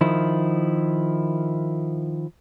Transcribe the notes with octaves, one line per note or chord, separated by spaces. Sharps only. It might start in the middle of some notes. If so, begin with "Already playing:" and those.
D#3 F3 E4